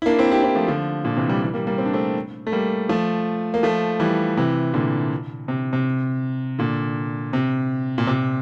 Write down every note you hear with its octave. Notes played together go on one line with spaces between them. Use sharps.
E4
A#3 D4
C4 E4
E4 G4
C4 E4
F3 A3
D3 F3
A#2 D3
C3 E3
E3 G3
E3 G3
G3 A#3
G3 A#3
C4
D4
A3 C4
A3
G3 A#3
F3 A3
A#3
F3 A3
E3 G3
C3 E3
A#2 D3
C3
C3
A#2 D3
C3
A#2
C3